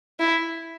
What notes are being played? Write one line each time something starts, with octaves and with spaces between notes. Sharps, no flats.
E4